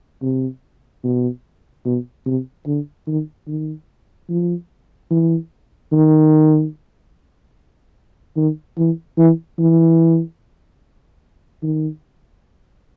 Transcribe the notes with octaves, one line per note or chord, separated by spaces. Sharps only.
C3
B2
B2
C3
D3
D#3
D#3
F3
E3
D#3
D#3
E3
E3
E3
D#3